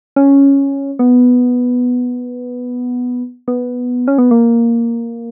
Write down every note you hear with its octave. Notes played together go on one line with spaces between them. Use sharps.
C#4
B3
B3
C#4
B3
A#3